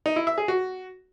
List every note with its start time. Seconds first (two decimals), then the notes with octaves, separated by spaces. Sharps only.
0.06 D#4
0.16 E4
0.27 E5
0.38 G#4
0.48 F#4